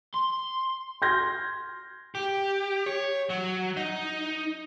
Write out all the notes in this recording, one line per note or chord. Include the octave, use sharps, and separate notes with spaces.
C6
C6 F6 G6 G#6 A#6
G4
C#5
F#3
D#4